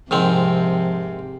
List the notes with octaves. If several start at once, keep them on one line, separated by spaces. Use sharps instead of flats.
G#2 C3 D#3 F3 C4